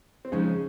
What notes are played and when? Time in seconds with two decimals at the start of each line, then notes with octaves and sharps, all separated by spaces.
0.25 C4
0.32 C#3 F3 G#3 C#4 D#4